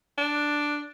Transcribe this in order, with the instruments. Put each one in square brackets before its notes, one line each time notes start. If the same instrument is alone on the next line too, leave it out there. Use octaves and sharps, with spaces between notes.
[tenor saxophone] D4